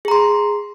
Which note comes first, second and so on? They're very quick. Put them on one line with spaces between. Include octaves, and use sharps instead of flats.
G#4 A#5 C6